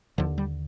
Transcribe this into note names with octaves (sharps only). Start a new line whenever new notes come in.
D#2 D3 F3
G3